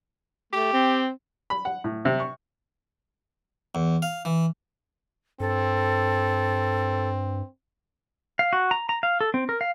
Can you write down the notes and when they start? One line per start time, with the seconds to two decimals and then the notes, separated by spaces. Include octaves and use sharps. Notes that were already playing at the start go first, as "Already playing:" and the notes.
0.53 A3 G4
0.73 C4
1.50 B5
1.65 F#5
1.84 A2
2.05 C3
2.20 C#6
3.75 E2
4.02 F5
4.25 E3
5.40 G2 C4 A4
8.39 F5
8.53 F#4
8.71 A#5
8.89 A#5
9.03 F5
9.21 A4
9.34 C4
9.49 A#4
9.61 F5